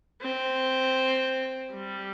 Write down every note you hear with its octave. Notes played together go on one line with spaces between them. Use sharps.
C4
G3